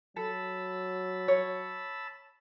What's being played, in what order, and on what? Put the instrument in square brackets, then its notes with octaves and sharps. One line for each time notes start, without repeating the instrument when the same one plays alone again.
[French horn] F#3 [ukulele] A4 [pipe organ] A5 B5 E6
[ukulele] C#5